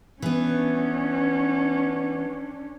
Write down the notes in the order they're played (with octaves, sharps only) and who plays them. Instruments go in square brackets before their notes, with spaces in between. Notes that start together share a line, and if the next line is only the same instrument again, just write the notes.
[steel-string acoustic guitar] E3 B3 [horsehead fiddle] C#4 D4